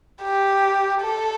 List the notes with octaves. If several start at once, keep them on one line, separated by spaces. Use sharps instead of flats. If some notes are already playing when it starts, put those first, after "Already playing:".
G4
A4